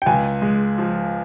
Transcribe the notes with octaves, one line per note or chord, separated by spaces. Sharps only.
G5
C#2 G#5
G#3
F3